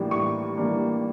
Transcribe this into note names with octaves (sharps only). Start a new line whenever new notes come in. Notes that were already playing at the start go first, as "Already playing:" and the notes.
Already playing: A2 E3 G3 A#3 D4
A2 C#6
E3 G3 A#3 D4